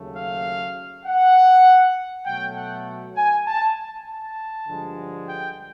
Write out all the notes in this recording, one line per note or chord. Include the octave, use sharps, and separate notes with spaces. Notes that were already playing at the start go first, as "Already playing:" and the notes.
Already playing: D#2 C#3 F#3 A3
F5
F#5
B2 F#3 A3 G5
F#5
G#5
A5
A5
G2 D3 F3 G#3
G5